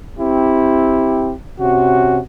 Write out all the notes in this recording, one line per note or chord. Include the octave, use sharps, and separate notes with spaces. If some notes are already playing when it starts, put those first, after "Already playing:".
C4 E4 G4
C3 C#4 F#4